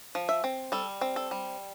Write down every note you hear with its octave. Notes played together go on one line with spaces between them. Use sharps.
F3
E5
C4
G3 A4
C4
A4
G3